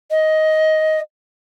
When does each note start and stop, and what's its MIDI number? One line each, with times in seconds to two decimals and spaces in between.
0.11 0.99 75